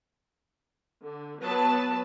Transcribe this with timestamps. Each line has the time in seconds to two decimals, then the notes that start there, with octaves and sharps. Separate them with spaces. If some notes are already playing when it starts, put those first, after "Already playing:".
1.06 D3
1.44 F#3 B3 B4 A5